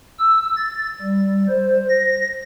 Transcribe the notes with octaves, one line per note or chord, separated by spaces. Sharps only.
E6
A6
G3
C5
A#6